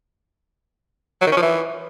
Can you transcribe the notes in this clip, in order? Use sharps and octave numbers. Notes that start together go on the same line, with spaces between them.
F#3
D#3
C#4
F3
E3